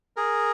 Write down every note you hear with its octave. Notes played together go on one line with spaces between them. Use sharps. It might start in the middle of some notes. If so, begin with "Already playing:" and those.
G#4 A#4